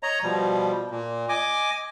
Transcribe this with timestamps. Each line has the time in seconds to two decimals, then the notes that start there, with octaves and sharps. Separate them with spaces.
0.03 C#5 D#5 A#5
0.23 B2 F3 G3
0.91 A#2
1.29 D#5 G#5 D6